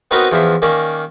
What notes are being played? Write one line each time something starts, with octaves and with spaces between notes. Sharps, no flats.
B3 C4 D#4 F#4 A#4 B4
E2 F3 C5 E5
D#3 A#3 C#4 D5